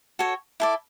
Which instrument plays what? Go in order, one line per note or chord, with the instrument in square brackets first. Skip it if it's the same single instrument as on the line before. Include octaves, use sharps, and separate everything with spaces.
[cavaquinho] F#4 A4 C#5
E4 A4 D5